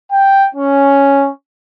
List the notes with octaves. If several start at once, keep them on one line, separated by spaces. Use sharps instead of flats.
G5
C#4